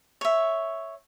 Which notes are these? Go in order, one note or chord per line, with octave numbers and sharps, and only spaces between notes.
C#5 E5